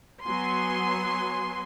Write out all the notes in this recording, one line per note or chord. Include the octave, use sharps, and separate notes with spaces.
F#3 B3 G#5 C6